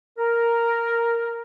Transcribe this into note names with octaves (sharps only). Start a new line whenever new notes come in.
A#4